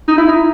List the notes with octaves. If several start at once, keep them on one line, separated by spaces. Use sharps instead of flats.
D#4
E4
D#4